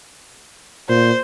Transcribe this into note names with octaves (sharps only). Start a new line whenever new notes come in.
A#2 C5